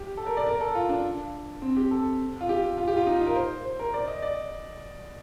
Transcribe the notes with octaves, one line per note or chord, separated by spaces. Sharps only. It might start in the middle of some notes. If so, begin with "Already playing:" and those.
Already playing: G4
A4
A#4
D5
A#4
A4
F4
D4
C4
G4
A4
F4
G4
F4
G4
F4
D#4
F4
A#4
C5
C5
A#4
D5
D#5
D5